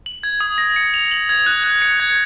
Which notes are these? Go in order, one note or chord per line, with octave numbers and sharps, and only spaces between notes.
F#7
G#6
D#6
A#6
C#7
F7
F#7
G#6
F#6
F#6
C#7
G#6